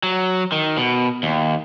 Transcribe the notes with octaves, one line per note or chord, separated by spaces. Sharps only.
F#3
D#3
B2
D#2